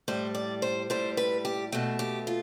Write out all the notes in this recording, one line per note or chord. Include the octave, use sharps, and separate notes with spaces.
A2 G3 C5
D5
C5
A2 G3 C5
B4
G4
B2 A3 C4
G4
F4